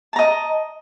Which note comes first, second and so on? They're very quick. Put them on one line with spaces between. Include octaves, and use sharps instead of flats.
A5 A#5 D#5